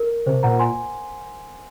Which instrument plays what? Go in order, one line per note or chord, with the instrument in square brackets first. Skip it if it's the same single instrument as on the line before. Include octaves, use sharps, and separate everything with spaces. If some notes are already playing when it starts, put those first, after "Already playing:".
Already playing: [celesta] A#4
[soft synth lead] C3 [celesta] C5
[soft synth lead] A#2 [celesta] F#5 A#5
[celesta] G#5 C6